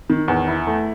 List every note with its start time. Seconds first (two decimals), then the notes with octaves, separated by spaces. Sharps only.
0.10 D#3
0.28 E2
0.48 E4
0.67 A3